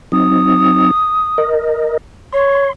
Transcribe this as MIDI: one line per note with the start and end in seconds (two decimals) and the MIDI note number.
0.12 0.91 54
0.12 0.91 60
0.12 0.91 63
0.12 1.47 87
1.38 1.97 70
1.38 1.97 75
2.32 2.67 73
2.32 2.73 84